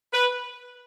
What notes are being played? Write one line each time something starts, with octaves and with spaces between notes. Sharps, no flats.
B4